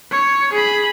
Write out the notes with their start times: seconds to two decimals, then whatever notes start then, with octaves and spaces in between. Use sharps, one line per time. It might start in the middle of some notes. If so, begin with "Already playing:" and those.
0.11 C#5
0.52 G#4 B5